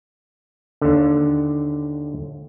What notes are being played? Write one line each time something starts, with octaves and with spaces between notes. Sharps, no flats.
D#2 D3